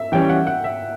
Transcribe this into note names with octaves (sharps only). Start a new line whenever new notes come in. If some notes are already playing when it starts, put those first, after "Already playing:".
Already playing: E5
E3 G3 C#4 G5
F#5
F#5
E5